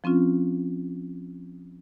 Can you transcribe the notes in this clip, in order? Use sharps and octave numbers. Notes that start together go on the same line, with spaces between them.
F3 C4 C#4 F4